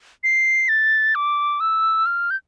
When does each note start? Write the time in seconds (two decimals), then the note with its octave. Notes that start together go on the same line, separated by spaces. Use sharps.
0.24 C7
0.69 A6
1.15 D6
1.60 E6
2.06 F6
2.31 G6